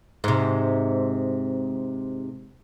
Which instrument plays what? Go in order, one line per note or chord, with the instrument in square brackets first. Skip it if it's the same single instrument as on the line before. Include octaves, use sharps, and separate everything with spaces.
[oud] G#2 C3